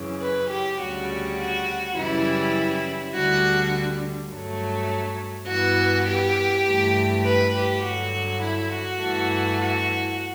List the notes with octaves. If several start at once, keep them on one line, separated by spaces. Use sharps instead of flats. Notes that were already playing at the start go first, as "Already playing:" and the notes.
Already playing: F#2 C#3 E3
B4
G4
D2 C#3 G3 F#4
F#4
F#2 C#3 E3 G3 E4
D2 D3 G3 F#4
G2 F#3 A3
G2 E3 B3 F#4
G4
G2 E3 A3
B4
G4
G2 D3 F#3 F#4
E4
F#4
G2 E3 A3
F#4